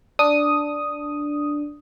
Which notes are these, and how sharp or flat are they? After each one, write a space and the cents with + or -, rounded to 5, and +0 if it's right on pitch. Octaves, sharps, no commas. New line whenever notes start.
D4 +0 D#6 +0